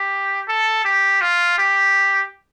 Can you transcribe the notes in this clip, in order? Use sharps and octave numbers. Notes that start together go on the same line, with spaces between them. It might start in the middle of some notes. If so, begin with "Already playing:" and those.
Already playing: G4
A4
G4
F4
G4